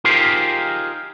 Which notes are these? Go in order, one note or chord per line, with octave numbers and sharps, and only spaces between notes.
D#4 F4 G4 G#4 A#4 C5